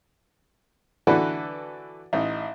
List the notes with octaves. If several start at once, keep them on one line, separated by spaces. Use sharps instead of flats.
D3 E3 F#4 A4 B4 D5
A1 D#4